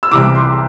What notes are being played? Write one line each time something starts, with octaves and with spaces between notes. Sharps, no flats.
E6
C2 C3 E3 D6
C6